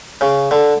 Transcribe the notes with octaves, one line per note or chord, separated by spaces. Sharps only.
C#3
D3